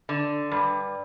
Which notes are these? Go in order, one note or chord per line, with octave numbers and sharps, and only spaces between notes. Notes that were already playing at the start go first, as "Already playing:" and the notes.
D3
G2